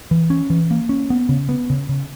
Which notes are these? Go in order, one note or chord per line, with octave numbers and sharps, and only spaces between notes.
E3
C#4
E3
A#3
C#4
B3
C#3
B3
C#3
C#3